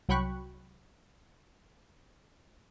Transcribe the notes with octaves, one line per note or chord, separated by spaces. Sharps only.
C2 F#3 G5 B5 C#6 F#6